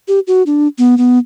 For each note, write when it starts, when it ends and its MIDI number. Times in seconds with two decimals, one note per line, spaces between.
0.08 0.20 67
0.27 0.43 66
0.46 0.67 62
0.78 0.97 59
0.98 1.18 59